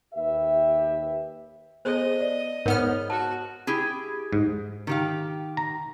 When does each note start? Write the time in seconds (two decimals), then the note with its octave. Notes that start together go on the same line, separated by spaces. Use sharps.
0.14 D#2 G4 B4 E5
1.85 B3 G#4 A4 C5 D#5
2.21 D5
2.66 G#2 B3 A#4 C#5 F6
3.10 F#4 A5
3.67 E4 G4 G#4
4.32 G#2
4.87 D#3 G4 F5
5.57 A#5